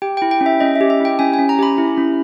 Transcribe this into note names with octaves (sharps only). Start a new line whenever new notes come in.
G4 G5
E4 G5
G5
C#4
E5
C#4 D#5
E5
G4
E5
E4 G5
C#4 G#5
G#5
C#4
A#5
G4 B5
E4
C#4